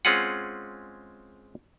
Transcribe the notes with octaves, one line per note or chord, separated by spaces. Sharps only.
G#3 C4 C#4 F4 G#4 F#5